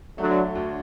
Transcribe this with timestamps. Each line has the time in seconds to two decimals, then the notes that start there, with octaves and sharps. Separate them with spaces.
0.18 D3 F#3 A3
0.55 D2